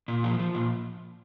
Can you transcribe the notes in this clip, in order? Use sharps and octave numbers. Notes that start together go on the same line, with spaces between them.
A#2
F3
F3
A#2